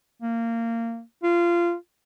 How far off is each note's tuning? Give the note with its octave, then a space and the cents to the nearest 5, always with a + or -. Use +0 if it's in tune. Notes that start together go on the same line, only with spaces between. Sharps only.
A#3 -20
F4 -20